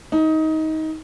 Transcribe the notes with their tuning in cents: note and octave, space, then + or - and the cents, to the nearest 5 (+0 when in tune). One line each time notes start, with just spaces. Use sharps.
D#4 +20